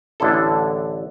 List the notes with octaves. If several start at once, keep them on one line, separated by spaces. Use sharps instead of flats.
A1 D3 D4 E4 A4